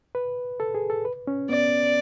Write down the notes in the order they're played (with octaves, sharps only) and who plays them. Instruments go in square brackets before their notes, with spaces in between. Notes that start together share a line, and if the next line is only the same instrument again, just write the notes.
[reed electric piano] B4
A4
G#4
A4
B4
C#4
[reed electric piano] B3 [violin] D5